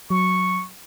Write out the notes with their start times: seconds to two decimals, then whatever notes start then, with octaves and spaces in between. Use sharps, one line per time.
0.10 F#3 C#6